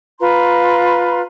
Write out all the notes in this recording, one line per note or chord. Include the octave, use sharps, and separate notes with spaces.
F4 B4 A#5 C6